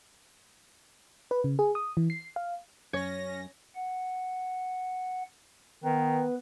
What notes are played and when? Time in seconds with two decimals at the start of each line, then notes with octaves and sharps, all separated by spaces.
1.31 B4
1.44 C#3
1.59 G#4
1.75 D#6
1.97 E3
2.10 C7
2.36 F5
2.93 F#2 C#4 C#5 A#6
3.75 F#5
5.84 D#3 B3 B4